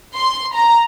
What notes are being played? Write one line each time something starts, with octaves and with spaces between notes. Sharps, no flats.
C6
A#5